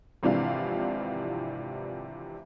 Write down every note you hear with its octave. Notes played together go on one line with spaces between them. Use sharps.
G#1 C3 E3 F3 D4 F5